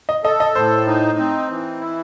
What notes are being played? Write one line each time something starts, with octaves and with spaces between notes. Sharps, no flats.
D#5
A4 D#5
D#5
A2 C5
D#4
C4
E3
E4